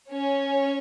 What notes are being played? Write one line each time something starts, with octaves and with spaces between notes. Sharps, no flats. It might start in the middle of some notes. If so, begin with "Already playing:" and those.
C#4 C#5